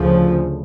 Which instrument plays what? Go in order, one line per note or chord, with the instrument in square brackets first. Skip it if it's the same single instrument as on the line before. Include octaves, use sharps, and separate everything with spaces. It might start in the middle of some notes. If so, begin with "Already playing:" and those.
Already playing: [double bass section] D2 C#3 F3